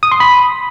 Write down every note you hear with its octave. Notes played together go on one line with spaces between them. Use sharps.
D#6
C6
B5